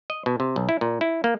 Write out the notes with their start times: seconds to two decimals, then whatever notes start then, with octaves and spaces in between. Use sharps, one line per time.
0.10 D#5
0.26 B2
0.40 C3
0.56 B1
0.69 E4
0.81 A#2
1.01 E4
1.24 A#3